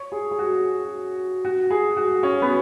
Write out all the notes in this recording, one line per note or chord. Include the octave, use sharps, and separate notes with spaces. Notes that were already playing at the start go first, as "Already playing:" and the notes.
Already playing: C#5
G#4
G#4
F#4
F#4
G#4
F#4
C#4
B3